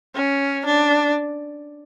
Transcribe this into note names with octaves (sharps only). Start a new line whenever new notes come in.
C#4
D4